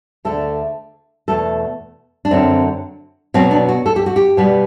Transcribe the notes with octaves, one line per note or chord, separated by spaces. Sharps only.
D2 D3 A3 A4
E2 B2 A3 A4
D4
F#2 D3 F#3 C4
B2 F#3 B3 C4
D4
F#4
A4
G4
F#4
G4
B2 G3 B3